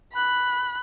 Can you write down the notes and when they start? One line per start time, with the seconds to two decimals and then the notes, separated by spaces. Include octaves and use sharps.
0.13 B5 F#6